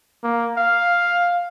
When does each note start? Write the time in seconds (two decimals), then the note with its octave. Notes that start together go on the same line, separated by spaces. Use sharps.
0.23 A#3
0.57 F5